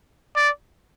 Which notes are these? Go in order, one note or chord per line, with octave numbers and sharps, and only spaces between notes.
D5